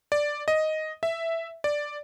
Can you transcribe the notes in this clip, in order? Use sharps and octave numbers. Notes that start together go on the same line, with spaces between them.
D5
D#5
E5
D5